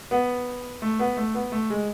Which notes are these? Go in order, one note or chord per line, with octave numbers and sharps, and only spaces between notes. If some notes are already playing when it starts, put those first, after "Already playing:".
B3
A3
B3
A3
B3
A3
G#3